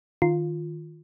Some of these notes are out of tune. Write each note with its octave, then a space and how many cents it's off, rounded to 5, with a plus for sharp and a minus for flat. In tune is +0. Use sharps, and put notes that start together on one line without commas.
D#3 +0 F4 +0